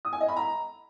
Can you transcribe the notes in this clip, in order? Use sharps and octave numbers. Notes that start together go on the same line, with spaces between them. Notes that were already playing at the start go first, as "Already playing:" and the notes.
D#6
G#5
D#5
B5
A#5